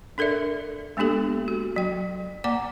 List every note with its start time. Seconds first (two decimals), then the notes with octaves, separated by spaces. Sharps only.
0.18 D4 A4 A#4 D5 E5
0.97 G#3 A#3 B3 D4 G4 A4
1.48 F#4
1.76 F#3 G5
2.44 A#3 D5 F#5 A#5 D6